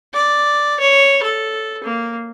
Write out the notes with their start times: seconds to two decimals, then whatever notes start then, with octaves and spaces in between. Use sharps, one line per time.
0.13 D5
0.80 C#5
1.23 A4
1.84 A#3